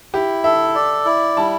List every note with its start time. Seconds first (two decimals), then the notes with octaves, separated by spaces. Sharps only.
0.14 E4 G4
0.44 A4 E5
0.75 D5
1.05 E4
1.37 G3 A5